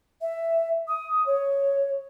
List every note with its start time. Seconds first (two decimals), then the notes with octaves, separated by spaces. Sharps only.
0.22 E5
0.88 D#6
1.26 C#5